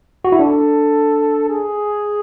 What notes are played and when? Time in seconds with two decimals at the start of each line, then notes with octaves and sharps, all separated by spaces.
0.25 F#4
0.32 E4
0.39 D4 A4
1.49 G#4